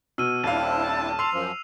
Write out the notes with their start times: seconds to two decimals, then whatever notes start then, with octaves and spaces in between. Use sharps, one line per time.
0.18 B2 E6 F6 D#7
0.44 D#1 C4 D4 E4 F5 A5
1.19 C6 E6 C7 F7
1.33 F#2 F3